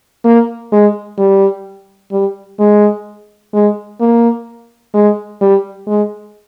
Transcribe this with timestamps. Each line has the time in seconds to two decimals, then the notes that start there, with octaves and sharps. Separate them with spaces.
0.24 A#3
0.72 G#3
1.18 G3
2.12 G3
2.60 G#3
3.54 G#3
4.00 A#3
4.94 G#3
5.41 G3
5.87 G#3